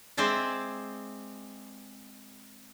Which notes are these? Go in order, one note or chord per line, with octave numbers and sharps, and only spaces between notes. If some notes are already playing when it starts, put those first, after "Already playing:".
G#3 C4 G#4 C5 D5 E5